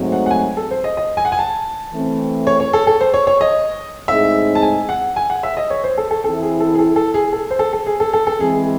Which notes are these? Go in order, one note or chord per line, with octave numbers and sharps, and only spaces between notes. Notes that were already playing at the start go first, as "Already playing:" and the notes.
Already playing: G#2 F#3 A3 C4
F#5
F#5
G#5
A4
C5
D#5
D#5
G#5
F#5
G#5
A5
E3 A3 C4
C#5
C#5
A4
A4
C5
C#5
C#5
D#5
A2 G#3 C4 D#4 G#4 E5
A5
G#5
F#5
G#5
F#5
E5
D#5
C#5
C5
A4
A4
E3 C4 E4 A4
G#4
A4
G#4
A4
A4
G#4
A4
C5
A4
A4
G#4
A4
A4
A4
E3 G#3 C4 G#4